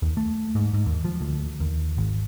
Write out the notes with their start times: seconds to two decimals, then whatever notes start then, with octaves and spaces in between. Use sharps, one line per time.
0.02 D#2
0.17 A3
0.55 G#2
0.73 G#2
0.86 D#2
1.05 F3
1.21 D2
1.60 D#2
1.97 G#1